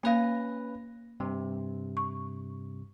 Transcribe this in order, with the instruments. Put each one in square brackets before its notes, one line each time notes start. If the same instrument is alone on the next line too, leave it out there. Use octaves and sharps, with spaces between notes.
[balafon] A#3 F5 [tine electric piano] C#4 B4 A#6
[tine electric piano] G2 C3
[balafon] C#6